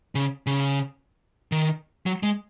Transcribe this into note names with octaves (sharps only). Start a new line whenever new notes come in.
C#3
C#3
D#3
F#3
G#3